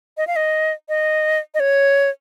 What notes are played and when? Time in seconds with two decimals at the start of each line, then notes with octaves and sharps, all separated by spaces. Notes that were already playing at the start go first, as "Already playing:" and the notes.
0.17 D#5
0.27 F5
0.36 D#5
0.89 D#5
1.54 D#5
1.60 C#5